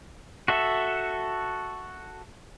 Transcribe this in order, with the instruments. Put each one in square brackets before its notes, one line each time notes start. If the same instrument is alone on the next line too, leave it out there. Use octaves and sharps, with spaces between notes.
[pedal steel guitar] F#4 A4 E5